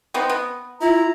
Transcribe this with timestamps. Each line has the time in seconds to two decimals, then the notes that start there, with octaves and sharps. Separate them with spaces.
0.14 B3 C4 D#4
0.30 B3
0.81 E4 F4 A#5